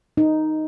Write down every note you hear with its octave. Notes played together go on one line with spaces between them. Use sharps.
D#4